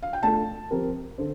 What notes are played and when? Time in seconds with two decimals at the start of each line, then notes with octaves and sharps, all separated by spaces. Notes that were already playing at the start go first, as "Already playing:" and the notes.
0.03 F5
0.13 G5
0.23 A3 D4 F4 A4 A5
0.70 F3 C4 G4 A#4
1.18 D3 A4 C5